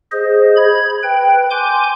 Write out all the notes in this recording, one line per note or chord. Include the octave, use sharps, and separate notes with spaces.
G#4 C5 D#5
B5 G#6
B4 G5
G#5 C6 D6 G6